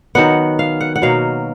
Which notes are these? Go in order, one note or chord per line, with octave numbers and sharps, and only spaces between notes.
D#3 F#3 B3 F#5
F5
F#5
F#5
B2 F#3 A#3 F5